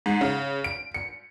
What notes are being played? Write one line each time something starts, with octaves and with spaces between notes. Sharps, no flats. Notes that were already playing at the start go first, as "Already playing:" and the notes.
G#2
C#3
D7
C#7